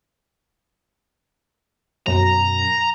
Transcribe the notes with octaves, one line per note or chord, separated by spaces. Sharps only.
F#2 B2 F#3 A#5